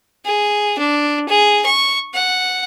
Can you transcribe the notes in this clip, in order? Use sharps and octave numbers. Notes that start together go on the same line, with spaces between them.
G#4
D4
G#4
C#6
F#5